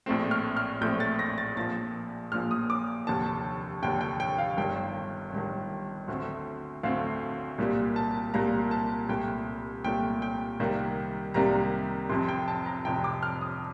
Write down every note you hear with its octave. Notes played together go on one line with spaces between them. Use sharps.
A#1 A2 A3 C4
F6
F6
A#1 A2 A3 C4 G6
A6
A#6
A6
A#1 A#2 F3 A6
A#1 A#2 F3 F6
D#6
D6
F1 D#2 D3 A5
F1 D#2 D3 G5
G5
G5
F5
G1 G2 D#3 G5
G1 G2 D#3
D2 D3 A3 C4
D2 D3 A3 C4 F5
C2 A#2 G3 A#3
A5
C2 A#2 G3 A#3 A#5
A5
C2 A#2 A3 G5
C2 A#2 A3 G5
G5
C2 C3 D#3 G3 A#3
C2 C3 D#3 G3 A#3 A#5
F1 F2 C3 C6
G5
A5
A#5
F1 F2 C3 G5
D6
F6
D#6